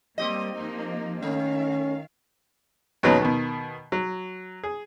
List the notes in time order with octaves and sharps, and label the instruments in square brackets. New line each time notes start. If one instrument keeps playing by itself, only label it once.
[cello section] G3 A#3 [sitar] C4 G4 D#5
[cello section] F3 A#3 D#4
[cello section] D#3 F5 [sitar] A3 [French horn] C#4
[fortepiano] D#2 B2 F#3 B3 C#4 D#4
B2 D#3
F#3
G#4